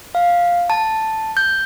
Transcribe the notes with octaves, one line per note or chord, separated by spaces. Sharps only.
F5
A5
G6